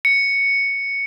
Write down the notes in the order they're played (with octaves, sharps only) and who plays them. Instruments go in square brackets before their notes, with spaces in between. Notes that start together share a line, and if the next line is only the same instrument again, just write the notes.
[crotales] C#7